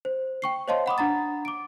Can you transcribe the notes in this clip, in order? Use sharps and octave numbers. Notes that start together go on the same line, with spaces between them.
C5
G5 C#6 C7
C5 C#5 D#5 F5 A5 C6
F#5 B5 D6 D#6
D4 F#5 A#5 A6
D6 D7